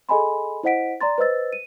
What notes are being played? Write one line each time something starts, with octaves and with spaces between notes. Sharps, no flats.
G#4 A4 D#5 G#5 B5 C6
E4 C5 D#5 F#5 B6 D7
D5 A#5 C6 A6
B4 C5 D#5 E6 A6
D#7